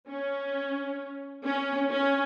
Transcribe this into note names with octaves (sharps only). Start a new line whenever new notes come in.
C#4
C#4
C#4